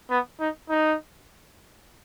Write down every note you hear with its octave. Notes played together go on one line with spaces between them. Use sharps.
B3
D#4
D#4